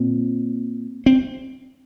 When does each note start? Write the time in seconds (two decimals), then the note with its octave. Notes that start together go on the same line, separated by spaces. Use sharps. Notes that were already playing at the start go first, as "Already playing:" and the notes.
Already playing: A#2 C4
1.06 C4